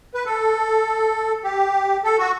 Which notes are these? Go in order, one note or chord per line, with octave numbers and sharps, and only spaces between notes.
B4
A4
G4
A4
F#4